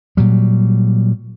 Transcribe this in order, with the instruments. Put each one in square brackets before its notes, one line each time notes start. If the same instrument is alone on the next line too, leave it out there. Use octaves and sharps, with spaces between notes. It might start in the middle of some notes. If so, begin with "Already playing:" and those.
[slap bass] A#2 F#3 G3